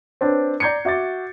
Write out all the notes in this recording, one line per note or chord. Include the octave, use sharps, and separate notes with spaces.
C4 D4 B4 C#5
D5 A#5 G6 G#6 C7 C#7
F#4 E5 D6 A6